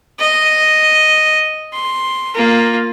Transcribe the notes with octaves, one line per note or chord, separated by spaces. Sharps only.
D#5
C6
A#3 F4